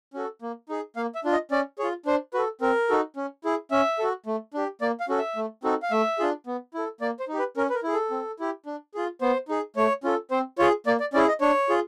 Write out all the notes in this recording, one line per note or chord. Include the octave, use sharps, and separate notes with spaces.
C#4 F#4 A4
A#3
D#4 G#4
A#3 F5
E5
D4 F4
D#5
C#4 D5
F4 G#4 C#5
D4 C5
F#4 A4 B4
C4 A#4
D#4 F#4 A4
C#4
E4 G#4
C#4 E5
F#4 A4
A3
D4 G4
A#3 D5
F5
C#4 F#4 A4
E5
A3
C4 D#4 F#4 A4
F5
A3 E5
D4 F4 G#4
B3
E4 A4
A#3 D5
C5
D#4 G4
B4
C#4 A#4
B4
A#4
E4 G#4
A4
C4
E4 G4
D4
F4 G#4
B3 C5
D#4 G#4
A3 C#5
C#4 F4 A4
C4 C5
F4 G#4 C#5
A#3 D5
D5
C#4 E4 G#4 D5
D#5
D4 C#5
F4 G#4